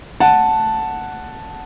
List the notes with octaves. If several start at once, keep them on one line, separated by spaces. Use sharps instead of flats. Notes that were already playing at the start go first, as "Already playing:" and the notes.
F#5 A5